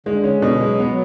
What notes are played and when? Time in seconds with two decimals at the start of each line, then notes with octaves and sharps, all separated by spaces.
0.06 D3 G#3
0.24 C#4
0.34 D3
0.42 B2
0.61 F#3 G#3
0.79 B3
0.89 F#3